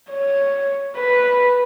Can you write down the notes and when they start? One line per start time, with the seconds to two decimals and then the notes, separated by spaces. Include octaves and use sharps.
0.11 C#5
0.97 B4